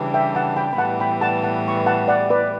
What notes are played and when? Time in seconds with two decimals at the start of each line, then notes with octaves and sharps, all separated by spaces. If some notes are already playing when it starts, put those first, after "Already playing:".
Already playing: C#3 E3 G3 D4
0.14 E5 G5
0.35 F#5 A5
0.56 G5 B5
0.73 B5
0.78 A2 E3 G3 B3 F#5 A5
1.00 G5 B5
1.21 F#5 A5
1.44 F#5 A5
1.68 C#6
1.77 B5
1.86 F#5 A5
2.08 D5 F#5
2.30 B4 D5